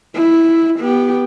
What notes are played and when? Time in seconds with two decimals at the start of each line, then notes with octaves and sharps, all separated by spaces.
0.14 E4
0.80 B3 G4